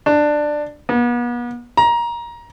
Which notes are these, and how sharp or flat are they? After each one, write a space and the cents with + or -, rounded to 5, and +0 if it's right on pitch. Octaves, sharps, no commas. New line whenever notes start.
D4 +15
B3 -40
A#5 +20